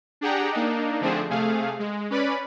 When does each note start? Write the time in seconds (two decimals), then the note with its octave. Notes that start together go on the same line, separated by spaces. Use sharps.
0.21 D4 G4 G#4 F#5 G5 A#5
0.52 A#3 D4 D#4
1.01 D3 F3 A3 C4 D4 G#4
1.30 C3 A3 G#4 F5
1.79 G#3
2.10 C#4 B4 D5 B5